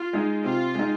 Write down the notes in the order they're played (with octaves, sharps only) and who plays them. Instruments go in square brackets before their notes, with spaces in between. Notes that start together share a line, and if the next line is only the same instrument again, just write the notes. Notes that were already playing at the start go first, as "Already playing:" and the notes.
Already playing: [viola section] F4
[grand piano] G#3 D#4
[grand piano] C3 [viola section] F4
[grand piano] G#3 D#4